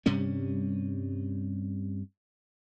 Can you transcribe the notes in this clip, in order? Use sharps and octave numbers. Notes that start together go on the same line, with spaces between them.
G2 C3 G3 C#4